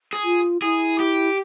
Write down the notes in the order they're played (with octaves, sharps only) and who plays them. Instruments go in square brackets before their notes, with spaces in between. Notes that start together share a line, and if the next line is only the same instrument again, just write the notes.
[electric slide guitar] G#4
[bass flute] F4
[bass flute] E4 [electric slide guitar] G#4
[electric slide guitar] G4